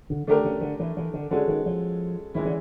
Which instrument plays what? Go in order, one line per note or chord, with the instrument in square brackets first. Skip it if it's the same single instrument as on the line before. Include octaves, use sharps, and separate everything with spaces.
[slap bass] D3
[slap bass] D3 [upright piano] A3 D4 G4 A#4
[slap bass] C#3
D3
E3
E3
D3
[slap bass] D3 [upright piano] G#3 C#4 F#4 A4
[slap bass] D#3
F3
[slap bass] D#3 [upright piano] E3 G#3 C#4 E4
[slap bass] D3